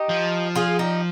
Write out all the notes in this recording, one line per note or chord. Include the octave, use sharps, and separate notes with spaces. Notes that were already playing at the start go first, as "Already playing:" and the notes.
Already playing: D#4 G4
F3
F4 G#4
D#4 G4